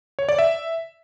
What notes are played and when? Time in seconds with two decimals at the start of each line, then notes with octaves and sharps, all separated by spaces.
0.19 C#5
0.29 D5
0.39 E5